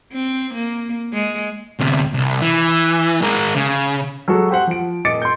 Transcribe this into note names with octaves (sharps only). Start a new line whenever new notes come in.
C4
A#3
G#3
D2 C3
C2
E3
G#3 A#4
C#3
F#3 G#3 F#4 A4
G4 C5 F#5
F3 D7
D#1 D#5 D6 A6 C#7 D7
C6 G6